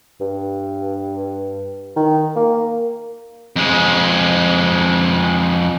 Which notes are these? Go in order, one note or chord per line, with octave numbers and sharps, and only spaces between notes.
G2
D#3
A#3
F2 G#3